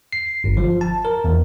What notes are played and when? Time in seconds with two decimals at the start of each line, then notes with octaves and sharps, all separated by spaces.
0.13 C7
0.44 G1
0.57 F3
0.81 A5
1.05 A#4
1.24 E2